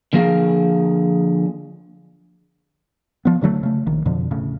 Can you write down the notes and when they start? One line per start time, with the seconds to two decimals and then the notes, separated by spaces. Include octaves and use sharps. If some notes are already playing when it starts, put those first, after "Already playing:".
0.13 D3 F3 A#3 G#4 F5
3.25 F3 B3
3.42 D1 D3 F#3 A3
3.63 C#3 A3
3.87 A#1 D#3
4.06 F2 B2 D3 F3
4.31 E1 A2 C#3